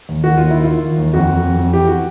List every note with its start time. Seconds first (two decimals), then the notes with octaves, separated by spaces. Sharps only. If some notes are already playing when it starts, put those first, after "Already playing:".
0.09 D#2
0.24 D#3 F#4
0.37 D#2 F4
0.50 D#3 E4
0.64 F4
0.69 D#3
0.83 D#3
0.98 D#2
1.13 F2 F#4
1.29 F2
1.44 F2
1.59 F2
1.73 E3 G4
1.87 F#4